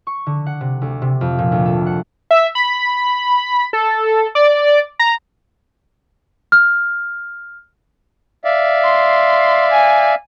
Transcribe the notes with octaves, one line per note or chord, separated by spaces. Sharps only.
C#6
D3
F#5
C3
D2
C3
F2
A#2
D2
A4
F#5
E5
B5
A4
D5
A#5
F6
D5 E5 F5
C6
G#5